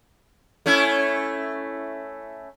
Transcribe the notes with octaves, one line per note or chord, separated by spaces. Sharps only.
A3 C#4 E4